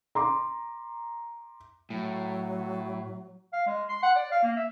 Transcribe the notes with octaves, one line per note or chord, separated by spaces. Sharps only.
A#5 C6 D6
A2 F#3
F5
G#3
C6
F#5
D5
F5
A#3
E5